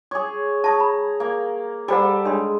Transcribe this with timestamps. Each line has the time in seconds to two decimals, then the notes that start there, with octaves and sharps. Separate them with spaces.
0.11 G#4 C#5 D6
0.64 A5 A#5 C#6 D#6
0.80 B5
1.20 A#3
1.88 G3 G#4 A4 C5 F#5
2.25 G#3 D4 C#5 C6